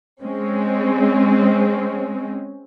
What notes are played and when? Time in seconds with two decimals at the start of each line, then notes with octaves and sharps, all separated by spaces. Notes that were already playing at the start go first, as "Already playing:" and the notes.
0.23 G#3 C4 C#4